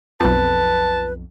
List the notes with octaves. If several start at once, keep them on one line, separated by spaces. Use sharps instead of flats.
B1 F2 B4 A5